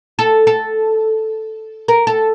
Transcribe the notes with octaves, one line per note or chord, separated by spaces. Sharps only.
A4
A4
A#4
A4